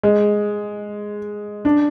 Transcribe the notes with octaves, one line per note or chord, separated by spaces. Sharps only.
G#3
D4